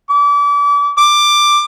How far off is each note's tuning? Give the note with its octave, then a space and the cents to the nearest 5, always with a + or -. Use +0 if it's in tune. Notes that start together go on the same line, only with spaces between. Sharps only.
D6 -35
D6 +10